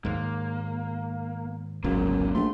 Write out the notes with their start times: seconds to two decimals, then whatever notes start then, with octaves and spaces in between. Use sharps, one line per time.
0.05 D#2 G#2 A#3
1.84 D1 G#1 C#2 F#2 B2 A#3
2.35 A#1 A3 C6